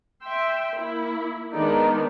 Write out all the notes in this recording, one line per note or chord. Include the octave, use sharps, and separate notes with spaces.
E5 G5 C6
A#3 E4
D#3 G#3 B3 D4 D#4 D5